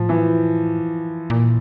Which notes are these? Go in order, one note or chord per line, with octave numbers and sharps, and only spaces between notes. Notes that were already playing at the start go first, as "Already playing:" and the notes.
Already playing: A2 F3
E3
A#2